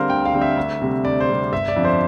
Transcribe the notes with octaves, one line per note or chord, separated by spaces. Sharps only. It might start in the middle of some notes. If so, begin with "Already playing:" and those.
Already playing: D3 G3 C4 A#4 C5 F5
D2 G5
F5
D3 G3 C4
E5
D2
C3 G3
D2 D5
C5
C3 G3
G1 E5
D5
F2 D3 F3
C5